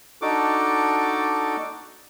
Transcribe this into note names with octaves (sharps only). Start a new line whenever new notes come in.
D4 D#4 F#4 A4 D6